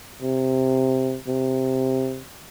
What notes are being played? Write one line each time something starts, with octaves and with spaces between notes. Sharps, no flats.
C3
C3